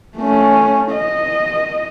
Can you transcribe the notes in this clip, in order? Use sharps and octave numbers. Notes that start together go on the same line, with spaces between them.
A3 C#4
D#5